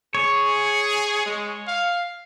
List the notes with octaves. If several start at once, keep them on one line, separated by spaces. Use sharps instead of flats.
G#4 C#5
G#3
F5